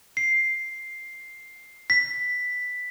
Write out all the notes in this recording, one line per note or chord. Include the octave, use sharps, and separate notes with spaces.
C7
B6